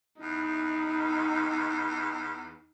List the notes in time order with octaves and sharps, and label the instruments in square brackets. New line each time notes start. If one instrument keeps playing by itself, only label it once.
[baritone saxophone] E2 [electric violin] D#4